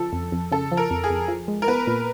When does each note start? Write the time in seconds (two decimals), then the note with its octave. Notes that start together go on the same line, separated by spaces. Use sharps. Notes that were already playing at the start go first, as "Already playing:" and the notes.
Already playing: C#3 F3 A4
0.13 F2
0.32 F2
0.52 C#3 A4
0.72 F3
0.77 A#4
0.91 F2
1.04 G#4
1.10 F2
1.28 F3
1.48 G#3
1.62 A#4
1.68 B3 B4
1.87 A#2